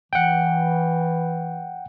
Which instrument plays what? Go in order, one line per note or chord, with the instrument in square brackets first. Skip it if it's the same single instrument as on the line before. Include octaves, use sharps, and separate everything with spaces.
[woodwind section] E3 [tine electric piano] F#5 G5